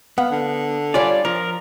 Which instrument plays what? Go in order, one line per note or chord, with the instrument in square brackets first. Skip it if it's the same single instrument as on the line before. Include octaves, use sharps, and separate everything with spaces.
[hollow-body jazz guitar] B3 [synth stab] F5 F#5
[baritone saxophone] D3
[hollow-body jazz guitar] G3 D4 F4 [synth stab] C#5 G#5 [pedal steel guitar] D5
[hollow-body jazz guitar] F3 [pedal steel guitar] A#4